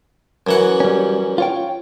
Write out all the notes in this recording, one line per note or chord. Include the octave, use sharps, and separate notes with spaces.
F#2 E3 F#5
G3 C#4
F4 C#5 G5